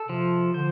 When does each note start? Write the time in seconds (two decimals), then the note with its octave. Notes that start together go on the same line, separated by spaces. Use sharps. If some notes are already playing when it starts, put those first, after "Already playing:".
Already playing: A4
0.08 C3 F3
0.54 D3 C5